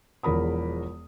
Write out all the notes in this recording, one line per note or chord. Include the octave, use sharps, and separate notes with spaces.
E1 E2 F3 A#4 B5 D#6